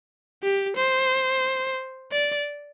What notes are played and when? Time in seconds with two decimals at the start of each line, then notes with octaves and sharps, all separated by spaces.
0.43 G4
0.76 C5
2.12 D5